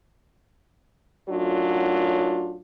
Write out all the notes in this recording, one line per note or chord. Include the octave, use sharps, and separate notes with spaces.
F#2 A2 F#3 D4 F4